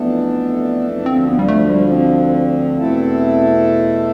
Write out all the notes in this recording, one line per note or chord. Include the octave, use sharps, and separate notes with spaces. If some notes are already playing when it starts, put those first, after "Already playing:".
Already playing: F2 E3 A3 B3 D4 A4
D2 D3 F3 C4
B3
G3
A3
G3
C4
E2 B2 A3 E4 A4